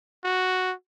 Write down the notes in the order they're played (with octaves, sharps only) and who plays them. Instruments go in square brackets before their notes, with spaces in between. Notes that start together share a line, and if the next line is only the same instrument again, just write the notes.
[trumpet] F#4